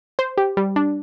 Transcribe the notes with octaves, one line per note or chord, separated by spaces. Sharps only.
C5
G4
G3
D4